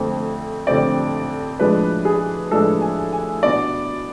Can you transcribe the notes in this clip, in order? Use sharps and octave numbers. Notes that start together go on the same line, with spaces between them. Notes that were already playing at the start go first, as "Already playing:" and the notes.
Already playing: F2 D3 A3 C4
F2 D3 A3 C4 D5
A2 F3 G#3 D4 B4
G#4
A2 F3 G#3 D4 A4
G#5
G#5
B2 B3 D4 D5